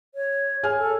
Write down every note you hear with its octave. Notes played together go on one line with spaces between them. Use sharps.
C#5
G#4 C#5 G#5 F6
A4